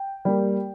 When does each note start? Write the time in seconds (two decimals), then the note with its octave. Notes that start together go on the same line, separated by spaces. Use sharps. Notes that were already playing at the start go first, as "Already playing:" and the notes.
Already playing: G5
0.25 G3 A#3